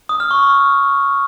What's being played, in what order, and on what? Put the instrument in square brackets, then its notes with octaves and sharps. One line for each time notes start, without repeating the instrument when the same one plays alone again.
[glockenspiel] D#6
F6
C#6